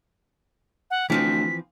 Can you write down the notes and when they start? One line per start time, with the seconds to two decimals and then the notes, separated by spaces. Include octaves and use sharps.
0.91 F#5
1.10 D2 E3 F3 C4 B6